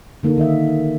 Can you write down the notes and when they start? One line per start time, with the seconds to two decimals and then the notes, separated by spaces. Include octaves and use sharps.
0.23 D3 A#3 D#4 A4
0.36 D3 D#3 D#5 E5